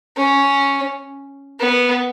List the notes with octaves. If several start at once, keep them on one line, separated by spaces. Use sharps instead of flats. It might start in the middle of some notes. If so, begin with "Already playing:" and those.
C#4
B3